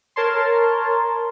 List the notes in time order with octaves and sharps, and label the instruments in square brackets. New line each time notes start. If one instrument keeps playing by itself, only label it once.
[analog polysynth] A#4 C#5 A5 C6